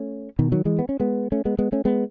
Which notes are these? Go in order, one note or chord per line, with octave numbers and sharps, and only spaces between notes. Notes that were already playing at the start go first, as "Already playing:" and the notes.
Already playing: A3 C#4
B2 D#3
D#3 F#3
E3 G#3
B3
C#4
G#3 B3
A3 C#4
G#3 B3
G#3 B3
A3 C#4
G#3 B3